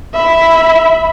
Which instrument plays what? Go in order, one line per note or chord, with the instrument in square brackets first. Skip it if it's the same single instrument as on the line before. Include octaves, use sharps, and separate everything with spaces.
[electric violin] E5 B5